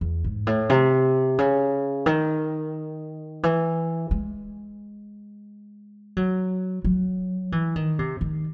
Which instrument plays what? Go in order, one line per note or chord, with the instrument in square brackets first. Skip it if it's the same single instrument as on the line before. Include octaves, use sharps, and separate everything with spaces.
[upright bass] E2
G#2
A2
C3
C#3
D#3
E3
G#3
F#3
F#3
E3
D#3
C3
D#3